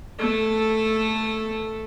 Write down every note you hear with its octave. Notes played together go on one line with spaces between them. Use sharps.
A3 A4